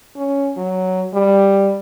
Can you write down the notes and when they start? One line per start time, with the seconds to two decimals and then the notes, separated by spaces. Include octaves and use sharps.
0.16 C#4
0.58 F#3
1.14 G3